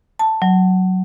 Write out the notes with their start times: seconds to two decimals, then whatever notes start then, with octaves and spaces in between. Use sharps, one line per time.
0.19 A5
0.42 F#3